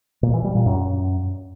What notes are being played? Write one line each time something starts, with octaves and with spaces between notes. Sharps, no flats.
A#2
E3
G3
A#2
F#2